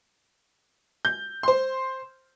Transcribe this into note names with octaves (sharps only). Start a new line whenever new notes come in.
G6
C5 C6